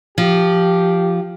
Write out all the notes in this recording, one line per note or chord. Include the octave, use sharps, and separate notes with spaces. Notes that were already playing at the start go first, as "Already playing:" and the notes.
F3 G4